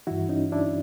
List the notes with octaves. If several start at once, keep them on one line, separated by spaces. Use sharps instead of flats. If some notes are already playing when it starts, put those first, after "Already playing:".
G2 E3 E4 F#4
C#4 D#4
D4 E4